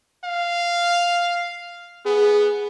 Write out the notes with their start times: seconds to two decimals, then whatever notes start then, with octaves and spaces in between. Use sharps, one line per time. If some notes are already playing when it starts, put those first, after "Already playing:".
0.24 F5
2.06 B3 G#4